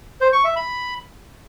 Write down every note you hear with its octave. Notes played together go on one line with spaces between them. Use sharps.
C5
C#6
E5
B5